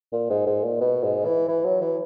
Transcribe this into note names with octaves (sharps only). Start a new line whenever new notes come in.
A#2
G#2
G#2
A#2
B2
G#2
E3
E3
F#3
E3